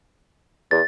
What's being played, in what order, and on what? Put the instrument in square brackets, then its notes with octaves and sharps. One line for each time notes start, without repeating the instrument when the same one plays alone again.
[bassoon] E2 [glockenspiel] A6